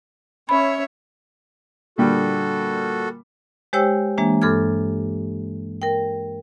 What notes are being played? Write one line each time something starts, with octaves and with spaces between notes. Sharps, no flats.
C#4 C#5 E5 B5
A#2 D3 G3 F#4 A4
G#3 G4 C5 C#5 G5 E6
E3 G#3 A#3 D4
G2 A4 D6 F6 G#6
A#4 G5